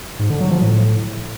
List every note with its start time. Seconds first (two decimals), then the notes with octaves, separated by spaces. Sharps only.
0.19 G#2
0.30 D3
0.41 F#3
0.51 F3
0.62 A2